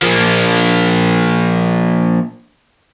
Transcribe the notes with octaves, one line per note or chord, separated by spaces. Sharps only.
F3 A#3